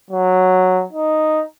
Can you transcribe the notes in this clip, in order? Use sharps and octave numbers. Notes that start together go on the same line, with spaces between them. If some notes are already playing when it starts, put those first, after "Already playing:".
F#3
D#4